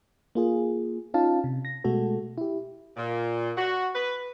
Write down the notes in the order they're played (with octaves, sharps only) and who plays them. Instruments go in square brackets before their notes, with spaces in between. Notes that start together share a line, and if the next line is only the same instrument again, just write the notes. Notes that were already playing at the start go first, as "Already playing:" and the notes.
[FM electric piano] A#3 F4 G#4
C#4 D#4 F4 F5 A5
C3
A#6
B2 G#3 A3 F#4 A4
E4 G4
[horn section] A#2
F#4
B4